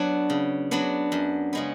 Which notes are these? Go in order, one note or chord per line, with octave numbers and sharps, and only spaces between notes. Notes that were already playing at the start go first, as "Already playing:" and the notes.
Already playing: F#3 B3 D4 F#4
C#3
F#3 B3 D4
F#2
C#3 G#3 B3